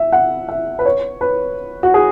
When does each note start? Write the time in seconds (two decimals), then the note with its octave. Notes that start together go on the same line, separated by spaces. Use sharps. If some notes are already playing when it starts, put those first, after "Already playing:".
Already playing: E5
0.12 F#5
0.49 E5
0.79 B4
0.85 C#5
1.21 B4
1.83 F#4
1.94 G#4